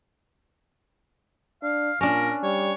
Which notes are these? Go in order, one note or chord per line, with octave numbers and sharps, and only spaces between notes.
D4 F5
A#2 C#4 D4 A#4
G3 C#5